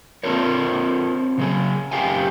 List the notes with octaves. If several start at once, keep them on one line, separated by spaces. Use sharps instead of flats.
C4 D4 F4 A4 A#4 C#5
C#3 F#3 G#4
F#2 G4 F5 G5 G#5